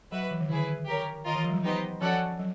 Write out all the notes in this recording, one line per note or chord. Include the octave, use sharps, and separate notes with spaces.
F#3 F#4 B4 E5
E3
D#3
D3 E4 G#4 B4
G4 A#4 C#5
D#3 F4 A#4 D#5
E3
F3
G3
F#3
B3 D#4 G4 C5 D#5
F3 C#4 F#4 A4 D5 F#5
F#3